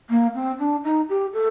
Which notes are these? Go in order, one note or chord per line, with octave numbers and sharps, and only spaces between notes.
A#3
C4
D4
D#4
G4
A4